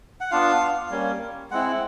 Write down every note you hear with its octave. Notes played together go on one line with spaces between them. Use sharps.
F#5
B3 D4 F4 F5
G3 A#3 C#4
G#3 C4 E4 F#5